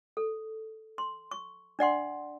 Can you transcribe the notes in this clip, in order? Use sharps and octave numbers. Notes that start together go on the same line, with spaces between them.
A4
C6
C#6
D4 D5 F#5 C6